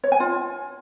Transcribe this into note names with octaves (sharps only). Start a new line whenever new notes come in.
C#5
G#5
F4